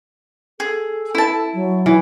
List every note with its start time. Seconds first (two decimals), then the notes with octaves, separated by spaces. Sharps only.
0.60 G#4 A4
1.15 E4 A5
1.54 F#3
1.86 E3